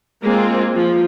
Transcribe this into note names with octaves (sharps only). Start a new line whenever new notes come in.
G#3 A#3 C4 F4
F3